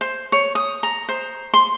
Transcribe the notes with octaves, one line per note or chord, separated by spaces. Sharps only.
C5
C#5
D#6
A#5
C5
C6